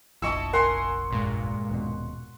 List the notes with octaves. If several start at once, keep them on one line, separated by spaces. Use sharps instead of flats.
F1 A#1 E4 D#5 A5 C#6 E6
A#4 F#5 G#5 C6
G2 A#2 G#3
D#1 B2